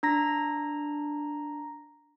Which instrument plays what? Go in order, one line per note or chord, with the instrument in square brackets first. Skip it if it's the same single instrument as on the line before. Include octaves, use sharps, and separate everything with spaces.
[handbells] D4 A#5 A#6